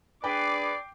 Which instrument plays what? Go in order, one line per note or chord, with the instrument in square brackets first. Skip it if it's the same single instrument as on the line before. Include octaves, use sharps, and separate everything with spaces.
[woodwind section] D4 G#4 B4 [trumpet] D5 [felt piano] G5 [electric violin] D6 C7